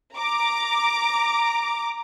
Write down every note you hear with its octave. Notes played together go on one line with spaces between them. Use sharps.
A#5 D6